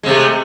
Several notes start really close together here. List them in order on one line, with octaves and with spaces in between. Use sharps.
G#3 C3 A3